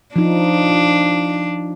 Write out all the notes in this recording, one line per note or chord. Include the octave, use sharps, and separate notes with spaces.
F3 D4 D#4